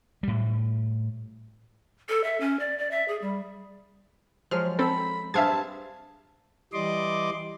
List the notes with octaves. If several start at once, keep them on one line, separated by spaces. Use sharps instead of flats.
A2 G3
A4
E5
C#4
D5
D5
E5
G#4
G3
F3 F#3 G#3 F6
C4 A4 B5
G2 C4 G#4 E5 F5 A5 G#6
E3 G3 D5 D#5 C6 D6